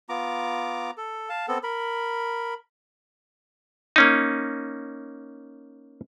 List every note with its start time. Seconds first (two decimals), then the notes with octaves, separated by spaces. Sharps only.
0.09 B3 F4 A#5 D6
0.97 A4
1.29 F5 A5
1.48 B3 C4 A4
1.63 A#4 B5
3.96 A#3 C#4 D#4